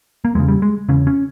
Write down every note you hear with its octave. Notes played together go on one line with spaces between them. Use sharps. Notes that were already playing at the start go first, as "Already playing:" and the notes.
A#3
E2 C#3 G#3
G3
G#3
E2 C#3 C#4
C#4